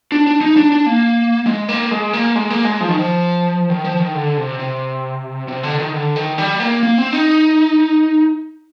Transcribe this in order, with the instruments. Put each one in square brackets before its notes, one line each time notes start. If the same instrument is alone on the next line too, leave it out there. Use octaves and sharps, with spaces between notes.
[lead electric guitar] D4
D4
D#4
D4
D4
A#3
G#3
A#3
G#3
A#3
G#3
A#3
G#3
F3
D#3
F3
D#3
F3
D#3
D3
C3
C3
C3
D3
D#3
D3
D#3
G3
A#3
A#3
C4
D#4